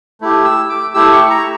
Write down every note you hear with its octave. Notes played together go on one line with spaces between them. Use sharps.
A3 E4 G4
E6
D6
A3 E4 G4 E6
C#6
A#5